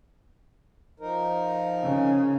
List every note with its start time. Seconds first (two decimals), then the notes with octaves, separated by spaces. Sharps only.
1.00 F3 D#4 A#4
1.83 C#3